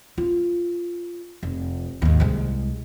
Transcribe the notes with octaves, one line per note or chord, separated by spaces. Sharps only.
F4
F1
D#2 G#2
C2 G#3